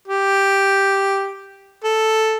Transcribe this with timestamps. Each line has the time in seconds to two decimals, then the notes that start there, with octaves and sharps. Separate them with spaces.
0.08 G4
1.84 A4